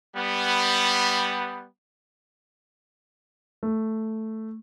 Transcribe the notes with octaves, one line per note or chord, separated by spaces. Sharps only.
G3 B3
A3